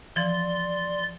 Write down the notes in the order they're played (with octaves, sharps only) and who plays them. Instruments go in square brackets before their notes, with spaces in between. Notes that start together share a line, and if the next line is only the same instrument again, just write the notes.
[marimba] E3 F3 [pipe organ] D5 C6